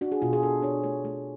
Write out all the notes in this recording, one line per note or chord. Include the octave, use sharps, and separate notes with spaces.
D4 F#4
G#4
B2 F4
G#4
D4 A4
D4 C#5
A3 C#5
A3